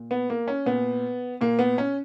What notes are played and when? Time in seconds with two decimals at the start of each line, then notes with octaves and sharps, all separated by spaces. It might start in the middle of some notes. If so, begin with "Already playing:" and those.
Already playing: A#2
0.11 B3
0.30 A#3
0.48 C#4
0.66 A#2 B3
1.41 A#2 A#3
1.59 B3
1.78 C#4